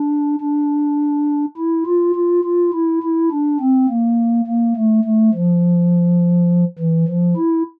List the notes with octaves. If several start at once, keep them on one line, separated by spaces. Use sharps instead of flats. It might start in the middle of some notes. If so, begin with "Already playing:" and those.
Already playing: D4
D4
E4
F4
F4
F4
E4
E4
D4
C4
A#3
A#3
A3
A3
F3
E3
F3
E4